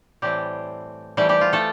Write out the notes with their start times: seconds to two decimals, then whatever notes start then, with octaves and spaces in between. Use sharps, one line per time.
0.22 A2 E3 G3 A3 C4 G4
1.17 E3 G3 A3 C4 G4
1.29 G3 G4
1.41 F4
1.53 A3 A4